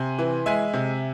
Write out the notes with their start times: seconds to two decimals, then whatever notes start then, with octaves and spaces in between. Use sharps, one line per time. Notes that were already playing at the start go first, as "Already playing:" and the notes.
Already playing: C3 G#5 C6
0.19 E3
0.46 G#3 E5 G#5
0.73 C3